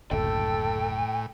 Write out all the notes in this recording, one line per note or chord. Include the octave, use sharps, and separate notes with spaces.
F#1 D2 A2 A4 G5